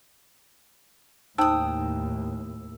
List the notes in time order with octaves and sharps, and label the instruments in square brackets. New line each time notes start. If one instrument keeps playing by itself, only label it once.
[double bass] D#2 A2 [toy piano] D#4 C5 [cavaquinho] G5 D#6 [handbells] E6